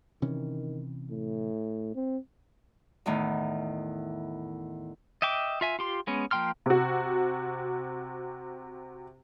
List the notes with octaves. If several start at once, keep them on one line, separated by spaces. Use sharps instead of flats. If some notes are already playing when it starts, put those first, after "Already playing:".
C3 D#3 E3 C#4
A2
C4
E2 A2 D#3
D#5 E5 G5 D6
F4 E5 G#5
F4 G4 C6
G#3 B3 C#4
F3 A#3 G5 C6 F6
C3 F#4